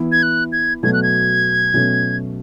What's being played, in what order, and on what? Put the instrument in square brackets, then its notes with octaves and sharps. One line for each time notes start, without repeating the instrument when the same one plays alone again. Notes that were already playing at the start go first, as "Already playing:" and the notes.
Already playing: [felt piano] E3 B3 E4
[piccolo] G#6
F#6
G#6
[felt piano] B2 F#3 A3 [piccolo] G#6
[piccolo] F#6
G#6
[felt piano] B2 F#3 A3 C#4